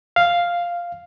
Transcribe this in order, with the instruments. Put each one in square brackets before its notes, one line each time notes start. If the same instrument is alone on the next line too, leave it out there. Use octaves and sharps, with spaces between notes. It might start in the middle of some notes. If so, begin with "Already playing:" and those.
[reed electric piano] F5